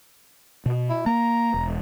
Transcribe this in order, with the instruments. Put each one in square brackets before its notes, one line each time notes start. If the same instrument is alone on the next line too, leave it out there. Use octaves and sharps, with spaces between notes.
[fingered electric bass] B2
[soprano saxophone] E4
[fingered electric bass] A#3 [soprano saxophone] A#5
[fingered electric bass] E1